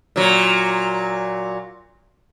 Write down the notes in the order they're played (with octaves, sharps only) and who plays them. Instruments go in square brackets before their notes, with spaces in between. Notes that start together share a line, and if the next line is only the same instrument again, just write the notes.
[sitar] A#2 F#3